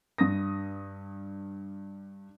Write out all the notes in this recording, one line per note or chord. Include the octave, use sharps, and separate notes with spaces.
G2 D#6 A#6